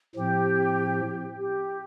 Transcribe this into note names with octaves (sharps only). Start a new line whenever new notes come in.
A2 F3 C4 G4
G4